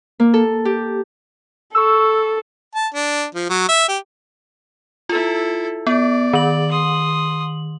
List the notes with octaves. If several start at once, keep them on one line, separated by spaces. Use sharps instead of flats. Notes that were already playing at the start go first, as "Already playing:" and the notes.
A#3
A4
G4
A4 C#6 E6
A5
D4
F3
F#3
E5
G4
E4 F4 A4
B3 D5
D#3 F#7
C6 D#6